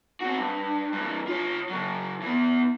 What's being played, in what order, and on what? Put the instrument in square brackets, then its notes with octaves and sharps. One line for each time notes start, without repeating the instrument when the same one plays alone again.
[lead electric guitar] C4 F#4
G2
G2 E3
F4 C#5
C#3 F#3
E3 B3